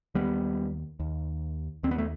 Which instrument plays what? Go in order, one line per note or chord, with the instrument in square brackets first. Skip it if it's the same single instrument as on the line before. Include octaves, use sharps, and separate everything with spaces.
[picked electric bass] D#2 G3 B3
D#2
D#2 C4
B3
A3